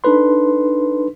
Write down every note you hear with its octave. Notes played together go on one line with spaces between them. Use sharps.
D4 D#4 A4 B4 C6